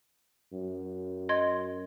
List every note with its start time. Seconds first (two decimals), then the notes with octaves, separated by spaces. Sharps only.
0.53 F#2
1.29 D#5 C6 G#6